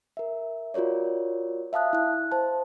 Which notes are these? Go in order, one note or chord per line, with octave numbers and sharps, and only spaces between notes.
A#4 E5
F4 F#4 A#4 C#5 D5
E5 F5 A5 D#6 F#6
E4 F#6
C5 A5